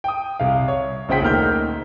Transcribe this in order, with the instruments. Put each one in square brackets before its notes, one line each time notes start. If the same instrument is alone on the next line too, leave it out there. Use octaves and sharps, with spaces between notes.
[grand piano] G5 D#6
C2 F5
C#5
A#1 C#3 C5 F#5 G5 B6
D2 D#3 A#3 F6 G6